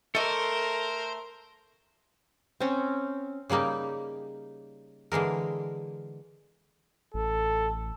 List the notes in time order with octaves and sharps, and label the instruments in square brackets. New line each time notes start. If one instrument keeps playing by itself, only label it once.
[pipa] A3 D#5 [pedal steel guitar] A4 D6 [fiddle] A#4 [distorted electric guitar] C5
[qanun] C4 C#4
[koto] C#3 G3 A#3 D#4 G4
D3 E3 G#3 A#4
[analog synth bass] A1 [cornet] A4